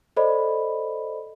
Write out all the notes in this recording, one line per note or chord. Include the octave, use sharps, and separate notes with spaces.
A4 C5 D5 D#5 B5